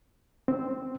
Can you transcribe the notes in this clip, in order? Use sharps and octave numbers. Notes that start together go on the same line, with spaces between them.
C4